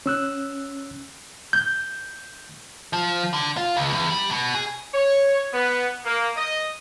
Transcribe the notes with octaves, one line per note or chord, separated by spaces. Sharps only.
C#4 E6 F#6
G6
F3
D3
F4
C#2
E2
G3
B2
G#4
C#5
B3
A#3
D#5